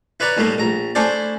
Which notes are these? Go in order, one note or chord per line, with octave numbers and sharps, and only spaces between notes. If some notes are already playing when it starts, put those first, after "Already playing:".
E4 B4 C#5 D5 A#5
D#2 A2 G3 A3 A#3
A#1 A#5
A3 C#4 D4 E4 C5 D5